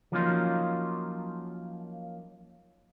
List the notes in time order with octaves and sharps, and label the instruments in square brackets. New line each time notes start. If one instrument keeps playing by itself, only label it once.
[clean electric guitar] F3 F#3 A#3 C#4 D#4 F4